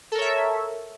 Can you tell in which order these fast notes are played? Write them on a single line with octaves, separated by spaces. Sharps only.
A4 A#4 C#5 E5